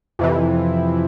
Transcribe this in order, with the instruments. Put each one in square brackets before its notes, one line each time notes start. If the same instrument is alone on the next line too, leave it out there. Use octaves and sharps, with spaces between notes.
[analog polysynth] F2 C3 E3